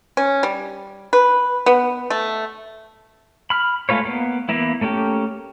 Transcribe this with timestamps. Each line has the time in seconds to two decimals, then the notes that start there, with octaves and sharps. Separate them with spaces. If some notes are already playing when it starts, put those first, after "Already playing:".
0.17 C#4
0.43 G3
1.13 B4
1.66 B3
2.10 A3
3.50 B5 F6
3.89 G#3 A3 F4 B4 C#5
4.05 A#3 B3
4.49 E3 A#3 B3 E4
4.81 A3 A#3 C#4 G4